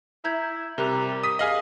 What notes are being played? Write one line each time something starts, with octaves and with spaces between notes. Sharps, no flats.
E4 A#5 G6 G#6
C3 G3 A#4 A#5 F#6
D#6 B6 D#7
G#4 D#5 F5 G#5 F6 F#7